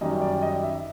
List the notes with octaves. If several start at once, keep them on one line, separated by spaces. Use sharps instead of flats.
F#2 D#3 G3 D#5
D5
D#5
E5